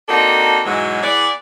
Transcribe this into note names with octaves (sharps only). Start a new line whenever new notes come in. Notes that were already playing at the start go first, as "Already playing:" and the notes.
A#3 C4 D4 D#4 F#4 A4
G#2 B2 E3 F#3 G#3
E3 B3 G#4 D5